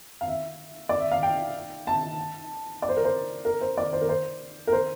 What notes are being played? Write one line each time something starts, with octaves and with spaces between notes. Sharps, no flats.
F5
E5
D5
E5
F5
G5
A5
D5
C5
A#4
C5
A#4
C5
D5
C5
A#4
C5
A#4
C5